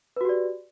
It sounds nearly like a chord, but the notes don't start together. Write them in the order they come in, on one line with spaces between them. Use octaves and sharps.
B4 F#4 G4 D5